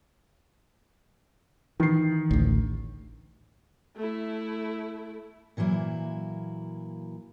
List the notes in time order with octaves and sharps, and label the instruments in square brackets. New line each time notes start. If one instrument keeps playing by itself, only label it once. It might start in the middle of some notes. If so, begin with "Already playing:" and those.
[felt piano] D#3 C7 [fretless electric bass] E3
[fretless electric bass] A1 D2
[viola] A3 E4
[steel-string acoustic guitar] A#2 E3 F#3 A#3 E4